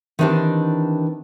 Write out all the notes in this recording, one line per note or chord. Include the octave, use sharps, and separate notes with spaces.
D#3 E3 C4 D4 D#4 G4